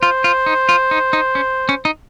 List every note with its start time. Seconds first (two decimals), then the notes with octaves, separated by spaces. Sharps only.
0.01 F4 C5
0.24 F4
0.46 D#4
0.69 F4
0.91 D#4
1.13 D#4
1.35 C#4
1.69 C#4
1.85 D#4